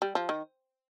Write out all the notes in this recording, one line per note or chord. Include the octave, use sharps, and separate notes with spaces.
G3
F3
D#3